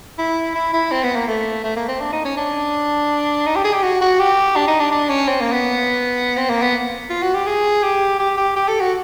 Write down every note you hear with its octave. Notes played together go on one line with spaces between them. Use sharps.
E4
E4
E4
C4
B3
A#3
A3
A3
A#3
C4
D4
D#4
C#4
D4
D#4
G4
G#4
G4
F#4
F#4
G4
D4
D#4
D4
D4
C#4
C4
A#3
B3
C4
A#3
B3
F4
F#4
G4
G#4
G4
G4
G4
G4
A4
F#4